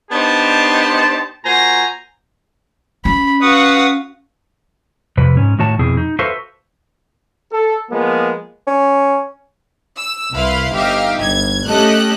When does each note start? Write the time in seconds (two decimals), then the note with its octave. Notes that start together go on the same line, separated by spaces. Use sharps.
0.11 B3 D4 D#4 G4 C5 A5
1.44 A#2 F#4 C5 G#5 A#5
3.05 C#4 B5
3.41 F#4 B4 F5 F#5 D#6
5.17 F2 C3 B4
5.37 G#2 C#4
5.59 A2 D#3 F#4 C#5 A5
5.79 F2 B2 C4 E4 G#4
5.97 D#4
6.19 F#4 A4 B4 C5 E5 F5
7.52 A4
7.90 F3 G#3 A#3 B3
8.67 C#4
9.98 E6
10.33 C2 E4 B4 F5 C6
10.74 G1 D#4 G4 E5 F5
11.21 G1 G#6
11.68 A3 C#4 G4 A4 D#5 F#6